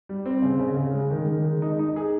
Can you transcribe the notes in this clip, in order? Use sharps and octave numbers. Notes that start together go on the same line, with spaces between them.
G3
C4
C#3
C#3
C#3
G#3
D#3
D#3
G#3
D#4
D#4
G#4